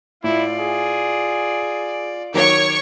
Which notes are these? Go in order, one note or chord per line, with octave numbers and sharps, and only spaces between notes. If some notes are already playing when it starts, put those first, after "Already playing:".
A2 E4 F4 D5
G#4
D#3 F#3 C#5 C#6 D6